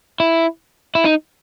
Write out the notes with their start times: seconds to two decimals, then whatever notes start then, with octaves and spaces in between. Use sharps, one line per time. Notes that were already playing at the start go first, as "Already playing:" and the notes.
0.20 E4
0.95 E4
1.05 D#4